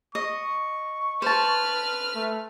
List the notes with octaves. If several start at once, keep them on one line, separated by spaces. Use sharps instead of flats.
D#5 C#6
B4 C5 A5 F6
A3